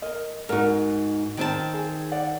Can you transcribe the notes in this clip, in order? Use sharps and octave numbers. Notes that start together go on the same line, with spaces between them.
A#4 D#5
G#2 D#4 F#4 A#4
D#3 C4 A5
G#4
D5 F#5